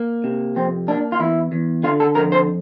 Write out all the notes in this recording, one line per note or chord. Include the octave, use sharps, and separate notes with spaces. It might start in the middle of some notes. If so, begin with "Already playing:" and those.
Already playing: A#3
C3
F2 C4
A#3 D4
F4
E2 E4
E2
D3 F4
A4
F2 A#4
C5